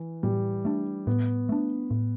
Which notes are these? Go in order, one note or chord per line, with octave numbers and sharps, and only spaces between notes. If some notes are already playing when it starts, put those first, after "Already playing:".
Already playing: E3
A2 G3
A3 D4
A2 B3
A3 D4
A2